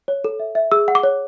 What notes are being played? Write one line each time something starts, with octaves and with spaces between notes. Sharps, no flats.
C#5
A4
E5
E5
G#4 E6
F#5
D6
C#5